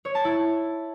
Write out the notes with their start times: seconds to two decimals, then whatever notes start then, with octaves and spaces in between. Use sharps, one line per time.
0.05 C#5
0.15 A5
0.25 E4